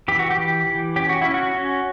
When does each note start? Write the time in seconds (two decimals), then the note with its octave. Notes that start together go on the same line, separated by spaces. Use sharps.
0.08 E3 G4
0.19 F#4
0.31 G4
0.37 E3
0.67 E3
0.96 C#4 G4
1.09 F#4
1.22 C#4 E4
1.34 F#4
1.55 C#4